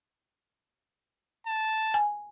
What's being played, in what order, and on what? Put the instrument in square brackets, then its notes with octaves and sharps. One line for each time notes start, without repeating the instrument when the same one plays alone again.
[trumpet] A5
[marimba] G#5